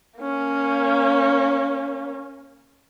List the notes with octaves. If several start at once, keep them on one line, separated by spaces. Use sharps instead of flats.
A#3 C#4